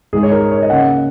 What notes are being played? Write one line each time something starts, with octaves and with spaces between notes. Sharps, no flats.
G#2 G#3 D#4 G#4
C#5
A#4
C#5
D#5
C#3 A#3 C#4 F#5